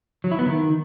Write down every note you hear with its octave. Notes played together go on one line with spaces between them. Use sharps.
F#3
E4
B3
D#3